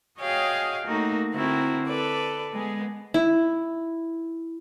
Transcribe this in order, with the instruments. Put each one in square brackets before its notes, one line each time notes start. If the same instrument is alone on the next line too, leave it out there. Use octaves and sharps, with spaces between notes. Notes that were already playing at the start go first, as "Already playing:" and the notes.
[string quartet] F#4 G#4 C#5 D#5 F5 G5
A3 A#3 D#4 F#4
D3 C4 E4 F#4 A#4
A4 B4 D5
G#3 B3 G#4
[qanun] E4